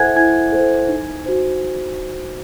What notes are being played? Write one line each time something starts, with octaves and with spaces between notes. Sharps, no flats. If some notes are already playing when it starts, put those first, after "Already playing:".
Already playing: E4 A4 C5 E5 F#5 G#5 F#6 G#6
E4 G#5 G#6
A4 C5
D#4
F#4 C5